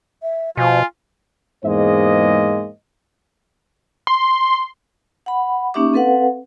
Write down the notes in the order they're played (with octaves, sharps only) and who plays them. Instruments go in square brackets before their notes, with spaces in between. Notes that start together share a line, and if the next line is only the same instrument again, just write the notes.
[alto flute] E5
[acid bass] B2 [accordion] F3 [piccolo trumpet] F4 [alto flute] G#5
[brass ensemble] E2 G#2 G#3 A#3 C5 D#5
[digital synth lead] C6
[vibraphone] F#5 B5
A#3 C#4 D#4 G4 E5 D6
C4 A4 B4 F5 F#5